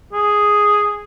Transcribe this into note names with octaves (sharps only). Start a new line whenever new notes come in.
G#4